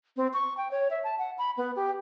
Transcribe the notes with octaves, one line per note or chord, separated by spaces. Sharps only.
C4
C#6
G5
C#5
E5
A5
F#5
B5
B3
G4